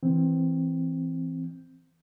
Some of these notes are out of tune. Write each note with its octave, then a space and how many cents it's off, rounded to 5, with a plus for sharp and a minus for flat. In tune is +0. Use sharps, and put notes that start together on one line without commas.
E3 +0 C4 +0